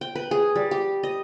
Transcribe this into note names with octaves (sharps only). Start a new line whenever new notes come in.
G5
B4
G#4
G3
G4
D#5